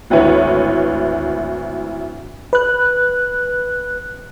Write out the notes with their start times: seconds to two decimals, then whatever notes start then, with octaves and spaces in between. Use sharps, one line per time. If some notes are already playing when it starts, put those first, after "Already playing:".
0.10 G#1 D2 E4 B4 C#5
2.53 B4 F#6